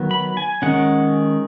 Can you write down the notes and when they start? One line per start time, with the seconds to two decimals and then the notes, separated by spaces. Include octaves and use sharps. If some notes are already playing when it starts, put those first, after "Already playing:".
Already playing: D#3 F#3 B3
0.11 B5
0.37 G#5
0.62 D#3 G#3 C#4 F#5